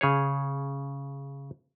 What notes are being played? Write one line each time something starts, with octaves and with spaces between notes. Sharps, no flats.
C#3 G#4 C#5